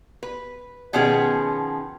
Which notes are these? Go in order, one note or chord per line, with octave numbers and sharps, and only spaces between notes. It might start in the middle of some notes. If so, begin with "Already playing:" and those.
B4
B2 D#3 F3 B3 C#4 G#4